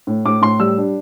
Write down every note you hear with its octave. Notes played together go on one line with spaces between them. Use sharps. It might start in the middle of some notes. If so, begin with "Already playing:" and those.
A2
A2 D6
A2 C6
G3 E6
D4